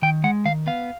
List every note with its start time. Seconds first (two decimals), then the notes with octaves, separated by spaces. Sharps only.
0.02 D#3 G5
0.24 G#3 F#5
0.45 D#3 F5
0.67 B3 F5